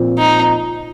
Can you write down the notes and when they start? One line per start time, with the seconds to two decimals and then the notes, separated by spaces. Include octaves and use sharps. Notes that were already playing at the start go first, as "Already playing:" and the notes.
Already playing: A#2 F3 C4 F4
0.18 D#4